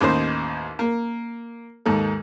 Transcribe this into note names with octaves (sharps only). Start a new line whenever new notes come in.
A1 D#2 D#4 C5
A#3
D#2 G#2 A4